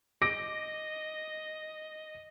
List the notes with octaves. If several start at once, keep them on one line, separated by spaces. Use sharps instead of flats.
D#5 D6 A#6 D7